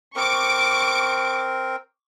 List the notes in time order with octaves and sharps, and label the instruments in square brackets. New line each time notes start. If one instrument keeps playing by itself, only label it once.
[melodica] C4 A#4 [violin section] C#6 D6 D7